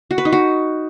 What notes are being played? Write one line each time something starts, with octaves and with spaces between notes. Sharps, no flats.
F#4
B4
D#4
F#4